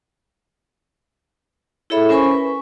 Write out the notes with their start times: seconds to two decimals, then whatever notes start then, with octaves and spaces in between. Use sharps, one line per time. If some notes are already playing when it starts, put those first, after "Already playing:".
1.90 E4 G#4 A4 C#5 E5 B5
2.09 C#4 A#4 C5 G#5 B5 C#6
2.31 B4